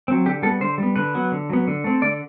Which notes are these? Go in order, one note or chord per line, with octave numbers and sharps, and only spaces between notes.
F#3 C4
D3 G4
G3 B3 A4
D3 C5
G3 B3
D3 B4
F#3 B3
D3
F#3 B3
D3
A3 C4
D3 D5